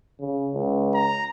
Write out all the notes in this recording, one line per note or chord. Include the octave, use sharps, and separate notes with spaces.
C#3
C#2
A#5